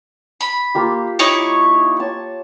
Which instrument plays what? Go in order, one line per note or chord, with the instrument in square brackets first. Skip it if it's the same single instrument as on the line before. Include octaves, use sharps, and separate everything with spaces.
[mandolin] B5
[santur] A#3 F4 G4
[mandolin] D#4 E4 C#5
[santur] C#5 A5